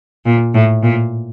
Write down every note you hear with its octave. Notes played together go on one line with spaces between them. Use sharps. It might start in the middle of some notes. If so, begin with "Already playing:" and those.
A#2
A2
A#2